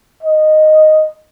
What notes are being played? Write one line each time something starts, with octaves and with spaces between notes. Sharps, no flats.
D#5